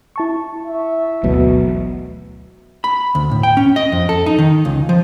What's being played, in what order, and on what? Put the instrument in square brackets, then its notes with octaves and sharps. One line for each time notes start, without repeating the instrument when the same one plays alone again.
[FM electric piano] E4 A5 C#6
[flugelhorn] E5
[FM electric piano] G#1 D2 [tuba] B2 [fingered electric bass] E3 F#3 A3
[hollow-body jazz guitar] B5
D2
A2
G5
C#4
D#5
F2
A4
D#4
D#3
C#2
F3